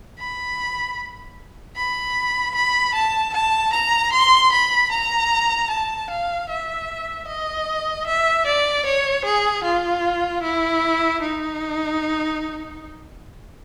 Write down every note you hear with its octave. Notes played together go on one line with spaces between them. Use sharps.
B5
B5
B5
A5
A5
A#5
C6
B5
A#5
A5
F5
E5
D#5
E5
D5
C#5
G#4
F4
E4
D#4